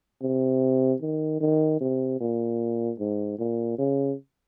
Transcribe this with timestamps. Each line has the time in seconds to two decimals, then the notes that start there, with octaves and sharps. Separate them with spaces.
0.22 C3
1.02 D#3
1.41 D#3
1.81 C3
2.21 A#2
2.99 G#2
3.39 A#2
3.78 C#3